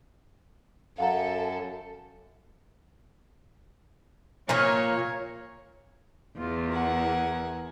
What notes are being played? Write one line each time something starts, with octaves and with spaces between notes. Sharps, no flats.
F#2 A4 F5 F#5 A#5
A#2 A#3 C#5
E2 F4
A#4 F#5 G#5